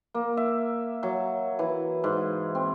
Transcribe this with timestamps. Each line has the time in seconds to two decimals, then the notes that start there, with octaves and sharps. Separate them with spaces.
0.14 A#3
0.37 E5
1.03 F#3
1.59 E3
2.04 G#2
2.55 C4